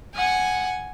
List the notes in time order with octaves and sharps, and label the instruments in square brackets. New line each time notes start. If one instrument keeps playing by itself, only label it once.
[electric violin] F#5 [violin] G#5